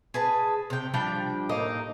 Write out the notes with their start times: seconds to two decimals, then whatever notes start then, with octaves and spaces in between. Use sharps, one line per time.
0.14 G#4 B4 A5
0.70 C3 G5
0.94 F3 G3 D4 G5
1.49 A2 A#3 D#4